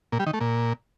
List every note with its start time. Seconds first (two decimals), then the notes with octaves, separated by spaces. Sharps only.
0.12 A#2
0.19 G3
0.26 D#3
0.33 A3
0.40 A#2